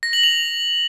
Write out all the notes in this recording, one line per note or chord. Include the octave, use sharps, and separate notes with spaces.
A#6
F#7
F7